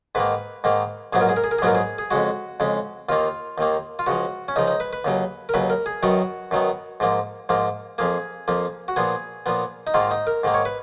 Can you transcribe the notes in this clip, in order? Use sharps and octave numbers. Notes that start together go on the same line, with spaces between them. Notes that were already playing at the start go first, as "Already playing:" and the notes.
G#2 D#3 A#3 B4
G#2 D#3 A#3
A#1 G#2 F#3 B3 G#4
A#4
G#4
A#4
G#4
A#4
G#4
A#1 G#2 F#3 B3 A#4
G#4
G#4
F2 C#3 G#3 F#4
F2 C#3 G#3
D#2 D#3 A#3 F4
D#2 D#3 A#3
F4
C#2 C#3 F3 F#4
C#4
C#2 C#3 F3 D#4
D#4
B4
B4
D#2 C#3 F#3
A#4
D#2 C#3 F#3 B4
A#4
G#4
F#2 D#3 F#3 B3 F#4
F#2 D#3 F#3 B3
G#2 F3 A#3
G#2 F3 A#3
F2 F3 A#3 G#4
F2 F3 A#3
F#4
A#2 F3 B3 G#4
A#2 F3 B3
D#4
G#2 D#3 A#3 F4
D#4
A#4
G#2 D#3 A#3
C#5
B4